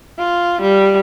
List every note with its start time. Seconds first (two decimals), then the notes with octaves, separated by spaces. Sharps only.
0.19 F4
0.61 G3